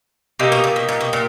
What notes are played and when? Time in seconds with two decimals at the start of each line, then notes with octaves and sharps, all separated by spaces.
0.39 C3 A#3 D#4 G4
0.52 B2
0.64 A#2
0.76 B2
0.89 A#2
1.01 B2
1.13 A#2